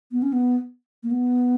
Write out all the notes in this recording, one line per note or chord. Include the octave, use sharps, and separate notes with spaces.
B3
C#4
B3
A#3
B3